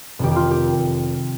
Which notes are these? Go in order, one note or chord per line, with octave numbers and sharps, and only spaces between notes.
F1 F2 D#3 G4
F4 G4
G4